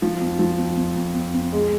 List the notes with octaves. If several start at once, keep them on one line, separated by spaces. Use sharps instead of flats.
F3
F2
F3
F2
F2
F2
F2
F2
G#3